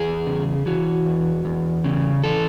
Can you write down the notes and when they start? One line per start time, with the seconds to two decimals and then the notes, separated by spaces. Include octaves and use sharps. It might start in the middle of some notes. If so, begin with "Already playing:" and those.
Already playing: E2 G#4
0.27 C#3
0.66 E3 F#4
1.06 E2
1.45 E2
1.84 C#3
2.24 E3 A4